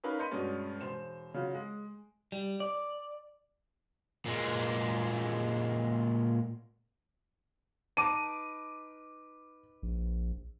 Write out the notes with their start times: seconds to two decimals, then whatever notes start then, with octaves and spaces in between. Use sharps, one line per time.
0.04 C#4 D#4 A#4 B4 F5 B5
0.18 D#5 B5 C6 G6 C#7 D#7
0.31 G2 B2 G#3 C#4 D5
0.81 E1 C5 E7
1.34 C#3 F#3 F4
1.54 G#3
2.32 G3
2.60 D5
4.26 A#2 G#3
7.97 D#4 B4 A5 D6 D#7
9.83 A#1